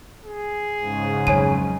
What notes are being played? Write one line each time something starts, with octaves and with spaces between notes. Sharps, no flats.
G#4
G#2 C#3
F2 F#3 C#5 G#5 D#7